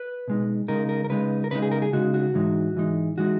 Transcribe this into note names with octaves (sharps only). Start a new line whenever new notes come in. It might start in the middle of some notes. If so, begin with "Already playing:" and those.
Already playing: B4
B2 G#3 D#4
C#3 G#3 D#4 A#4
A#4
A#4
C#3 G#3 D#4 B4
A#4
C#3 G#3 D#4 B4
G#4
A#4
G#4
C#3 G#3 D#4 F#4
F#4
G#2 E3 G#3 D#4
G#2 E3 G#3 D#4
E3 G#3 D#4 F#4